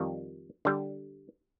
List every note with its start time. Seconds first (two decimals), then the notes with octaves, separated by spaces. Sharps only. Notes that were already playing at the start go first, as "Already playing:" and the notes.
Already playing: F2 D#3 G3
0.65 D3 G3